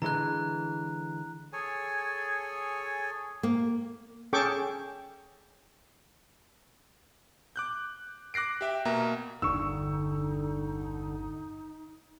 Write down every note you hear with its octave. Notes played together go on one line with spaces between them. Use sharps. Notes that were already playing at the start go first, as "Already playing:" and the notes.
D3 E3 G#3 A#5 F#6
G#4 A4 C#5 G#5
A#3
C#4 G#4 A4 G5 C#6 D6
D6 F#6 G6
D6 F#6 A#6 C7 D7
G4 E5 G5
B2 A#3 E5 A#5
G1 E2 G2 D3 D#4 C#6 E6